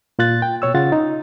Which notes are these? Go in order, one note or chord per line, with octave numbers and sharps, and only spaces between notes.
A#2 F4 F#6 A6
G5
B2 C#5 E6
C#3 F4 F#5 A6
D#4